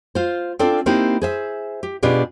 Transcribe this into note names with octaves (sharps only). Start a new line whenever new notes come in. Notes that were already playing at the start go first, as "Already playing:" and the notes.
F4 C5
C4 D4 F4 A4 D5
A#3 C4 D#4 E4 G4
G#4 C5 E5
G4
B2 D4 F4 G4 G#4